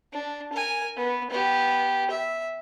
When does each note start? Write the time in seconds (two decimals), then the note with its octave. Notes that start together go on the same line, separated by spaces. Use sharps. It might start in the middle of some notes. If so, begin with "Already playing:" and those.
0.13 D4
0.53 A#4 G#5
0.97 B3
1.31 B3 G4
2.10 E5